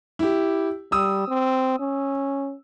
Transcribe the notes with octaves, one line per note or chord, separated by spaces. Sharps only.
E4 G4
G3 D#6 E6
C4
C#4